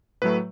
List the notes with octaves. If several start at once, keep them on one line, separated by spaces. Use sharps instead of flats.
A2 F#3 A3 B4